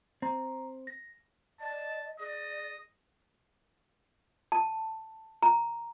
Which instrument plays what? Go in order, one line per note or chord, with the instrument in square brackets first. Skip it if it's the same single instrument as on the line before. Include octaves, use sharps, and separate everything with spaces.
[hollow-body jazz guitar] C4 [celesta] A#5
[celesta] A#6
[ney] D5 [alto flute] D#5 [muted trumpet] A5
[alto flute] G#4 [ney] D5 [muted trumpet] D#5
[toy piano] A5
A#5